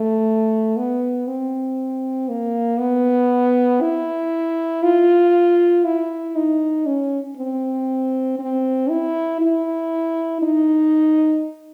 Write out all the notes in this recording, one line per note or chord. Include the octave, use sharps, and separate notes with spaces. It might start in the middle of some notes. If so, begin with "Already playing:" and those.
Already playing: A3
B3
C4
A#3
B3
E4
F4
E4
D#4
C#4
C4
C4
E4
E4
D#4